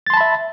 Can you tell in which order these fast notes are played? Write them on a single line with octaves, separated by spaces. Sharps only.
A6 C6 A5 B5 E5